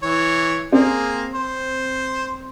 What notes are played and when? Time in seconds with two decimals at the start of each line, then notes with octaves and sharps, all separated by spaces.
0.03 E3 C#5
0.72 A#3 C4 G#4
1.34 C5